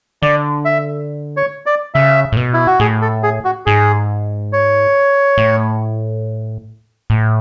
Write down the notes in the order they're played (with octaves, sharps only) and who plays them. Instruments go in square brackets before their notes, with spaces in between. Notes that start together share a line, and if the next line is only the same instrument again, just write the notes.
[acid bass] D3 [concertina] D5
[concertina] E5
C#5
D5
[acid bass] C#3 [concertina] E5
[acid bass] A2
B2
[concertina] E4
F#4
[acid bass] A2 [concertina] G#4
[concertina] A4
G#4
F#4
[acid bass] G#2 [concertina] G#4
[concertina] C#5
[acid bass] A2
A2